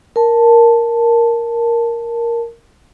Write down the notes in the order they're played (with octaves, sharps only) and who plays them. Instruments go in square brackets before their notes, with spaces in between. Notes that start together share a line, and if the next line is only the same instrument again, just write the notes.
[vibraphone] A#4 A5